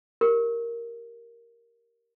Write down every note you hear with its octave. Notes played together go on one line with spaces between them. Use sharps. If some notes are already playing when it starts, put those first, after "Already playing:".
G4 A#4